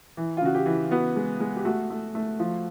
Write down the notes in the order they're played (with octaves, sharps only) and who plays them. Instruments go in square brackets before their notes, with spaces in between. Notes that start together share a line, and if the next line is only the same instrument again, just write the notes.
[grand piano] E3
F4
C#3 F#4
G4
E3
B3 F#4
G#3
G#3
G4
A3 F#4
A3
A3
F3